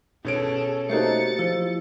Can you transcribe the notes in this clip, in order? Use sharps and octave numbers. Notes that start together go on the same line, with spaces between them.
B2 C#4 G#4 A4 D7
A3 A#3 D#4 F#4 G4 C5 A6 C#7
F3 E4